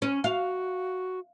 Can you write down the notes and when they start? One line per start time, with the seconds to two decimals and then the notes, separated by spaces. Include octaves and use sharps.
0.02 C#4
0.24 F#4 F5